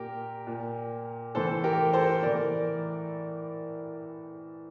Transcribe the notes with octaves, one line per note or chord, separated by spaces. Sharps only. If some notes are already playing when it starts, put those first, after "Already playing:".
Already playing: A#2 G4 A#4
A#2
A2 E3 A4 C5
G4 A#4
A4 C5
A2 E3 A#4 D5